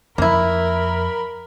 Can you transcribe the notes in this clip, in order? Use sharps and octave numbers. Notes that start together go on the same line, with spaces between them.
F2 A#3 E4 A#4 B5